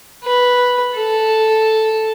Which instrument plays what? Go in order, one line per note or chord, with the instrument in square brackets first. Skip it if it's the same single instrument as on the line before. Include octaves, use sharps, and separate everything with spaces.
[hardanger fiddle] B4
A4